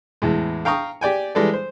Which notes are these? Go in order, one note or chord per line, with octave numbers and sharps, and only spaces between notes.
E2 A2 G#3
F5 G5 A#5 C#6 D#6
G4 D5 G5 G#5
E3 G3 G#3 A4 D5
C5